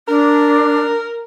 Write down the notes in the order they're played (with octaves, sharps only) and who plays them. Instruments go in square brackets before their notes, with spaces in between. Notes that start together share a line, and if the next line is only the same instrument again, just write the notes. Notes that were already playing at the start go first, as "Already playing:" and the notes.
[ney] D4 [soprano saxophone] A#4